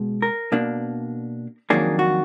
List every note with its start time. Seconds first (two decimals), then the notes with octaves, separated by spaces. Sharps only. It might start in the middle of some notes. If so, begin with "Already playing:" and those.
Already playing: B2 G#3
0.22 A#4
0.52 B2 A#3 D4
1.70 F2 D#3 F#3 A#3 D4 G#4
1.99 F#4